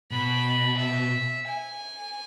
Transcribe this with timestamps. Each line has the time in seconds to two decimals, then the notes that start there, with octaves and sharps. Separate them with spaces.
0.11 B2 B5
0.79 E5
1.48 G#5